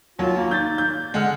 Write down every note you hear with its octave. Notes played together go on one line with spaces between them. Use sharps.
D#2 F#3 F4
A#3
D#3 G6 A6
G6
D3 G#3 F#5 F6